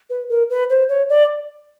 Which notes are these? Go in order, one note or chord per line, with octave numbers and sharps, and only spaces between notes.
B4
A#4
B4
C5
C#5
D5